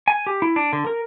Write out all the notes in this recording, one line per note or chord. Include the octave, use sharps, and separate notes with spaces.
G#5
G4
E4
D4
D3
A#4